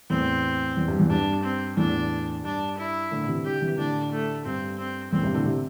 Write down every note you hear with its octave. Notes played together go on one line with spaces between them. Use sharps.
E2 A2 C4
E2
G2
E2
G2 D4
C4
E2 A2 D4
G2 D4
E4
A2 D3
C3 E3
D3 G3 G4
C3 E3
A2 D3 D4
A3
G2 C4
C4
E2 A2 C4
G2 C3
A2 D3
C3